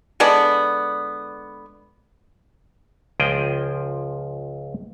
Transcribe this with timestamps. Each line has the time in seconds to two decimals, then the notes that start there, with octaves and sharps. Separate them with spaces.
0.20 D3 G#3 B3 D5
3.20 C#2 F3 G#4 G5